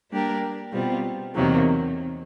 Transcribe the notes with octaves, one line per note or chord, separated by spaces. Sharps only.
G3 A#3 D4 G4 A#4
B2 G3 C4 F4
E2 C3 D#3 F#3 A#3